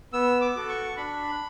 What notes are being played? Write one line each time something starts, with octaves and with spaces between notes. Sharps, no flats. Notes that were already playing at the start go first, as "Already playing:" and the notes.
B3 E6
D6
F#4 A4
C#6
D4 B5